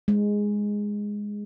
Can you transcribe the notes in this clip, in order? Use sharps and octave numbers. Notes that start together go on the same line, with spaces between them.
G#3